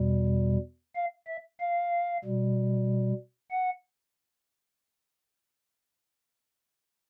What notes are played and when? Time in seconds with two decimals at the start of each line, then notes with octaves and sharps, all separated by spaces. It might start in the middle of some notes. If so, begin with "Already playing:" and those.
Already playing: E2 B2 G3
0.95 F5
1.27 E5
1.60 F5
2.24 B2 G3
3.50 F#5